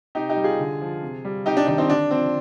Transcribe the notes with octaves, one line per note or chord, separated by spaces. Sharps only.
C3 D#4 G4
D#4 G4
G3
F4 G#4
D3
F3
C3
G3
C3 D#4 G4
D4
D#3 G3 D4
C4 D#4
D3 D4
F3 C4